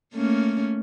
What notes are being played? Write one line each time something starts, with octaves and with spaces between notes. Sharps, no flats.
A3 A#3 C#4